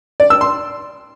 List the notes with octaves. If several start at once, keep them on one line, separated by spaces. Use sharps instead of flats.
D5
E6
C6